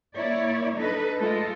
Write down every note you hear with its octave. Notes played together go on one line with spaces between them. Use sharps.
A#3 E4 C#5 D5
D4 D#4 A4 B4
G#3 A3 F4 A4